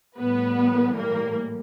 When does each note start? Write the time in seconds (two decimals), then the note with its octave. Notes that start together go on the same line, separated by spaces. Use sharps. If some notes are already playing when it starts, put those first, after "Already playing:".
0.18 A2 E3 G3 B3 B4
0.95 A#3 A#4